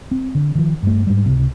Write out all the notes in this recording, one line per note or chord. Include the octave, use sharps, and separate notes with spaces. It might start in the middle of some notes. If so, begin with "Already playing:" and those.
C4
D3
D#3 F3
G2 A3
G#2 G3
C#2 C3